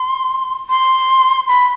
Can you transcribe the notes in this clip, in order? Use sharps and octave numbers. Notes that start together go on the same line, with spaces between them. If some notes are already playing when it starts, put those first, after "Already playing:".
Already playing: C6
C6
B5